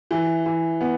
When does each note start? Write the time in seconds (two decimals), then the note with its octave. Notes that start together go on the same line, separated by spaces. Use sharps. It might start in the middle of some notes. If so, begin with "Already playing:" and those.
0.11 E3
0.46 E3
0.81 B3